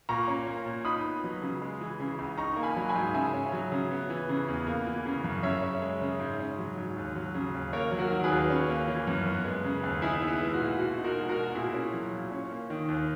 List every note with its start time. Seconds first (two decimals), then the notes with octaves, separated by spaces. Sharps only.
0.09 A#2 A#5 C#6
0.28 C#4
0.47 A#3
0.66 A#2
0.85 D#4 B5 D#6
1.04 B3
1.24 F#3
1.42 C#3
1.62 G#3
1.81 E3
2.00 C#3
2.19 C#2
2.38 D#4 A#5 C#6
2.56 A#3
2.63 G#5 B5
2.76 F#3
2.89 G#5 B5
2.95 G#2
3.14 C#3 E5 G#5
3.34 C#4
3.52 F#3
3.72 C#3
3.91 B3
4.10 E3
4.29 C#3
4.48 E2
4.67 A#3
4.86 E3
5.06 C#3
5.24 F#2
5.43 C#3 C#5 E5
5.62 C#4
5.82 G#3
6.01 C#3
6.20 G#2
6.40 C#4
6.59 F#3
6.78 G#2
6.96 D#2
7.16 F#3
7.34 C#3
7.54 D#2
7.73 A#3 A#4 C#5
7.92 F#3
7.99 F#4 A#4
8.11 D#3
8.24 G#4 B4
8.30 D#2
8.50 C#4
8.68 A#3
8.87 E3
9.07 F#2
9.26 B3
9.45 G#3
9.64 C#3
9.83 D#2
10.02 D#4 E4 G#4
10.22 B3
10.28 E4
10.40 G#3
10.53 F#4
10.59 A#2
10.79 B2 F#4
10.98 D#4
11.04 F#4 A#4
11.17 G#3
11.29 F#4 A#4
11.36 B2
11.55 A#2 E4 G#4
11.74 C#4
11.93 F#3
12.13 A#2
12.31 C#4
12.51 A#3
12.70 D#3
12.88 D#2